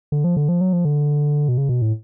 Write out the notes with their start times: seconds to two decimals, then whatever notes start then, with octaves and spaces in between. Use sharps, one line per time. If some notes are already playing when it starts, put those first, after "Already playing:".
0.12 D3
0.24 F3
0.37 D3
0.49 F3
0.61 F#3
0.73 F3
0.85 D3
1.48 B2
1.58 C#3
1.69 B2
1.82 A2